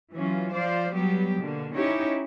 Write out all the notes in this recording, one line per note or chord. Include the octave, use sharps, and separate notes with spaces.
E3 F#3 C#4 F4
F3 C5 D5 F5
F#3 G3 B3 G4
B2 D3 A#3
C#4 D#4 E4 G4 C#5